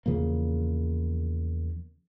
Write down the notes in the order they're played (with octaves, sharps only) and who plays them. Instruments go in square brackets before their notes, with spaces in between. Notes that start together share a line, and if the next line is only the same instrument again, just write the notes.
[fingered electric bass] E2 C#3 F3 A#3